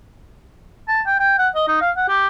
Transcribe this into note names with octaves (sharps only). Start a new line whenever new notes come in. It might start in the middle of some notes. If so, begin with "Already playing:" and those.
A5
G5
G5
F#5
D#5
D#4
F5
F#5
G4